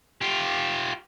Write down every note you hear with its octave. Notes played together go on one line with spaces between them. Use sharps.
F4 G4